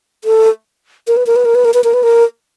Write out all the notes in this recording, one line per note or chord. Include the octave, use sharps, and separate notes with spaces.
A4
A#4
B4
A#4
B4
A#4
B4
A#4
B4
A#4
B4
A#4